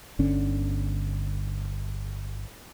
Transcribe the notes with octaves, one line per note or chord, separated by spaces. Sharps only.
G1 D3 C#4